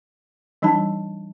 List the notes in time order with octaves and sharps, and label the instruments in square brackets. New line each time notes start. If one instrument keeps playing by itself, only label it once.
[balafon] E3 G3 D4 D#4 A5